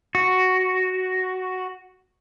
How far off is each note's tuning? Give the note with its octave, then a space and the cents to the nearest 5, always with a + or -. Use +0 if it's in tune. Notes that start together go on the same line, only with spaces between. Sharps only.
F#4 +5